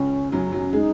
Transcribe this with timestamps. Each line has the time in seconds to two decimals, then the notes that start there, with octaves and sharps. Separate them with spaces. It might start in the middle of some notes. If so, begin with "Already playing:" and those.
Already playing: C#2 C#3 C#4
0.32 F#2 F#3 C#4
0.52 F#2 F#3
0.73 G#3 D#4